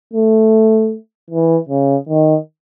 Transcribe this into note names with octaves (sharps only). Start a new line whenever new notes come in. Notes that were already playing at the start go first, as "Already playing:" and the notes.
A3
E3
C#3
D#3